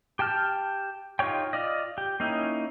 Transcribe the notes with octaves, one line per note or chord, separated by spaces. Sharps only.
G4 G5 A5 F6
D#4 F4 G4 C#5 G5
F4 D5 D#5
G4
A#3 C#4 D#4 E4